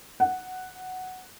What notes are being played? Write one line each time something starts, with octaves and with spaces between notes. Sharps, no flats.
F#5